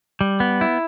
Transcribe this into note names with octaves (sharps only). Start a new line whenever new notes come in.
G3
B3
E4